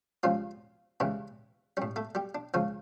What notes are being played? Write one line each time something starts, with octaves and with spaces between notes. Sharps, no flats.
C#2 C#3 F3 G3 F4
C#2 C#3 E3 G3 E4
A2 G3 C#4
A3 A4
G3 G4
D4
C#2 C#3 F3 C#4